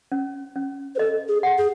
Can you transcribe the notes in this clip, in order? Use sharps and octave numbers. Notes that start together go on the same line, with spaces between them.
C#4
C#4
C5
A4 D#5
G#4
F#5
G#4